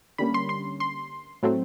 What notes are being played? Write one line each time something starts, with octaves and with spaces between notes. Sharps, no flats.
D3 G3 A#3 C#4 B5
C6
C6
C6
A2 F#3 A3 C4